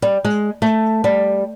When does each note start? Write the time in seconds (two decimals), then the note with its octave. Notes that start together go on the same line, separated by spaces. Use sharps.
0.02 G3
0.25 G#3
0.62 A3
1.04 G3